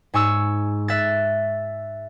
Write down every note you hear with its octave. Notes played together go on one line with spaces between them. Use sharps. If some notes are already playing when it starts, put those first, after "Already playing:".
G#2 G#5 C#6 E6
E5 F#6 A6